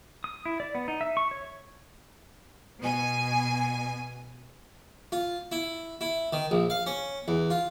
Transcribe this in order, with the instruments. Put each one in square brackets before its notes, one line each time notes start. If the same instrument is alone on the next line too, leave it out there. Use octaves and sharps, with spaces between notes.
[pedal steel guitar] D#6
E4
D5
B3
D#4
E5
C#6
C#5
[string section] B2 G#5
[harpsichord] F4
E4
E4
D#3
A#1
F5
C#4
E2
F4